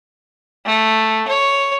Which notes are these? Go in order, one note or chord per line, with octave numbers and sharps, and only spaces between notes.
A3
C#5